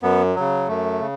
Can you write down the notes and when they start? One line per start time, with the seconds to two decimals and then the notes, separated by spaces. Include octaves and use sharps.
0.03 F#2 B3
0.36 C#3 F#3
0.68 F#2 A3
1.00 C#3